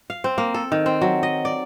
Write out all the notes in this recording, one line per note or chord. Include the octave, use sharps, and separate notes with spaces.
F5
C4
A#3
A4
D#3
C4
F#3
D#5
D5